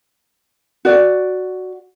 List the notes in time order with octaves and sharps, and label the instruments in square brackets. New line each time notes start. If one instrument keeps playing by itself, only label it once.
[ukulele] F#4 D5